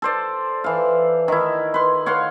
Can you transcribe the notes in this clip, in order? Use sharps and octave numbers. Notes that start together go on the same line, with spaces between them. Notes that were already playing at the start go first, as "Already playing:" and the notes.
A4 C5 D5
E3 F5
D#3 E4
B4 C6
C#5 F5 F#5 C6